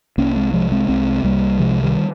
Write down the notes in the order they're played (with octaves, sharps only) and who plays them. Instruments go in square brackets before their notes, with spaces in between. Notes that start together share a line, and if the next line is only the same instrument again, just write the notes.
[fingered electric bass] C2 A#3 C#4
G#3 C4
C3 F3 G#3
G#3 C4
C2 G#3 C4
C2 G3 A#3
C3 F3 G#3
D#3 G3